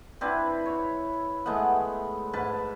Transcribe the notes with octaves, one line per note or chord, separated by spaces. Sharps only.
C4 D4 E4 B4
C#5
G#3 A3 B3 F#5
G#2 B4 A5